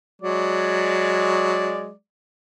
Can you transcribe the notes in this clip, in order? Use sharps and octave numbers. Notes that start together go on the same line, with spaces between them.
F#3 G#3 D5